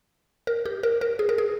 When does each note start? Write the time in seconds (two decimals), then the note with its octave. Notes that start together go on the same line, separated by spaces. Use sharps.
0.47 A#4
0.66 G4
0.83 A#4
1.01 A#4
1.19 G#4
1.29 A#4
1.38 G#4